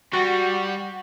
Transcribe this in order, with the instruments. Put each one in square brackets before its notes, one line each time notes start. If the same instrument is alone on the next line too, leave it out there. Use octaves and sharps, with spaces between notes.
[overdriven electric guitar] G3 [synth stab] F#4 [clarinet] C#6